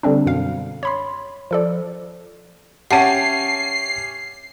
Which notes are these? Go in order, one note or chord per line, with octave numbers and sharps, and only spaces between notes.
D3 G3 C4 D4
F#2 B2 F5
C#5 B5 C6
F3 A4 D5
C#4 G4 E5 F#5 A5 C7 D#7